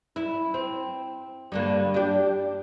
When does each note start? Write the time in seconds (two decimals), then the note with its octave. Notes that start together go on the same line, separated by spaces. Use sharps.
0.16 E4
0.54 C4
1.52 G2 D3 A#3
1.94 D4 G4